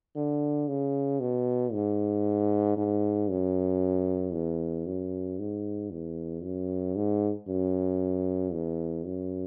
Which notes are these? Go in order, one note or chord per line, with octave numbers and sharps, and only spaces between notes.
D3
C#3
B2
G#2
G#2
F#2
E2
F#2
G#2
E2
F#2
G#2
F#2
E2
F#2